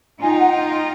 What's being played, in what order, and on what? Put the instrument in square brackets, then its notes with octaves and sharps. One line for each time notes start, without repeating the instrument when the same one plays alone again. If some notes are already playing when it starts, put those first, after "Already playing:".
[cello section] D#4 F4 [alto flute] G#5
[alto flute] G5
F#5
G5